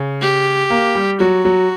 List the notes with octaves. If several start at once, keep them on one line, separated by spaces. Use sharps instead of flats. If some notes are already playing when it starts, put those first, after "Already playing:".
Already playing: C#3
G4
A#3
G3
F#3 F#4
F#3